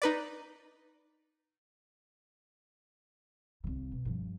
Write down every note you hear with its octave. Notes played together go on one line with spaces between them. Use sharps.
D#4 B4 D5
C2 C#3
B2
G2 F3